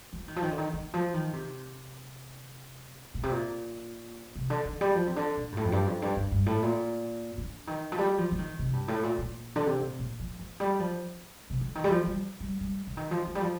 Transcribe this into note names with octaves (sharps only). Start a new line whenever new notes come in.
F3
D#3
F3
D#3
D3
D#3
D#3
F3
D#3
C3
A#2
C3
A#2
C3
D3
D#3
G3
F3
C3
D3
A#2
G2
A2
F2
G2
F2
G2
G2
G2
A2
A#2
D3
D#3
F3
G3
F3
F3
D#3
C3
G2
A2
A#2
A#2
D3
C3
A#2
A#2
F3
F3
G3
F3
C3
D3
D#3
G3
F3
G3
G3
G3
D3
D#3
F3
F3
G3
F3